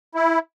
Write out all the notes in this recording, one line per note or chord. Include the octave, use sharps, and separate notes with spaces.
E4